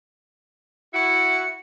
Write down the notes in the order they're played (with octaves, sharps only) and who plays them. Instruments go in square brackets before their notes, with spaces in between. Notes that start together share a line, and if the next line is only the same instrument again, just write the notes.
[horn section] E4 F#4 [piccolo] C#7